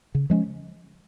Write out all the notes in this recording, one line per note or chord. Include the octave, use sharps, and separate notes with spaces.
C#3
F3 G#3 C#4